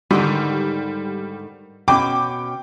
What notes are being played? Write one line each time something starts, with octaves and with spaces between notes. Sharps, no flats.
G#2 D3 D#3 G3
B2 C#4 G5 D6